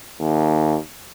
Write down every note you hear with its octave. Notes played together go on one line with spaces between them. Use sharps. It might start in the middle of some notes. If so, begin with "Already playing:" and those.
D#2